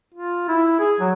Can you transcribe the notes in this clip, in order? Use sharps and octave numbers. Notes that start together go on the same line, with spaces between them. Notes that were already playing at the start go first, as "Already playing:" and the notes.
F4
E4
G#4
F#3